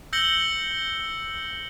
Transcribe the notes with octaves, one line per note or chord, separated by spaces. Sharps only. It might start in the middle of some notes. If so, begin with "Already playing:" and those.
E6 G6 A#6 C#7 F#7 G7